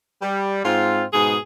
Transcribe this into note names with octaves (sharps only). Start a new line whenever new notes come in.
G3
G#2 C4 F4
G#2 B2 G#4